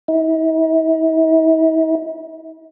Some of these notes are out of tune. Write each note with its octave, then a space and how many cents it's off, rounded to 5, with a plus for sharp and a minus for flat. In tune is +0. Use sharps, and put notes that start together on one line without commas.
E4 -45